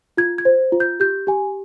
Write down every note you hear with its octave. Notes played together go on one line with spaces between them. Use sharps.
F4 G#6
G#6
C5
F4
G6
G4 G6
G4 G#5